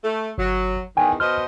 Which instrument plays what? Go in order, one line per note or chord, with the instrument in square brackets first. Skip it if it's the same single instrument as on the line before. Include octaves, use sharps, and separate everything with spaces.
[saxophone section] A3
[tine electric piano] G1 [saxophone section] F#3
[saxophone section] E2 D#3 [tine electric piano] G5 G#5
[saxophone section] B2 C5 D#5 [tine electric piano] F6